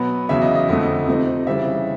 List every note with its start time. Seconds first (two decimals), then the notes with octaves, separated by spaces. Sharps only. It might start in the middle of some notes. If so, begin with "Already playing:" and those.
Already playing: B2 F#3 B3 B4
0.29 E2 C#3 F#3 E5
0.42 D#5
0.55 D#5
0.68 F2 D3 F3 A3 D#5
1.07 C3 F3 A3 C4 D#4
1.47 C#3 E3 G3 C4 E5